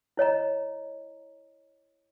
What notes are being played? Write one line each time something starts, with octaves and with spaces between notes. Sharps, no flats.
E4 C#5 D#5 A#5